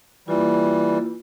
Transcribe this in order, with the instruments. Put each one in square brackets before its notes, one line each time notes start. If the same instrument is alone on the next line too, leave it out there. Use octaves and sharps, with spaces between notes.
[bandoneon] E3 G3 [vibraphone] A#3 E4 F4